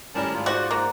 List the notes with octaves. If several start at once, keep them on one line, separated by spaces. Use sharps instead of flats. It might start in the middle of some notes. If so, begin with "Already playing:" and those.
G#1 A2 G3 C#4 A#4 A5
G#2 F4
F#4 C5 D5 F#5
A#3